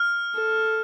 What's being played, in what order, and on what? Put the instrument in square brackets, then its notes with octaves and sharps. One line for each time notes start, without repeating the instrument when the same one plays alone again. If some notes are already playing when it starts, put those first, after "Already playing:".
Already playing: [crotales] F6
[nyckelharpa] A4